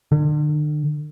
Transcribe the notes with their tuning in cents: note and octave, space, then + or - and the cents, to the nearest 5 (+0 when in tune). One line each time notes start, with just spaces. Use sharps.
D3 +40